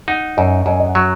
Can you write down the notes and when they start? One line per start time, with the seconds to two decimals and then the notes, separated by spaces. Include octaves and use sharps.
0.08 D#4 F#5
0.37 F#2 D#5 G#5
0.66 F#2 D#5 G#5
0.80 D#5
0.86 F#5
0.95 F#3